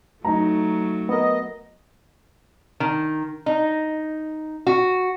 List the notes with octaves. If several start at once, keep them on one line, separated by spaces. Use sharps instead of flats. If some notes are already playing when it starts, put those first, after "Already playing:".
F#3 A3 D#4 A#5
B3 A#4 D#5
D#3
D#4
F#4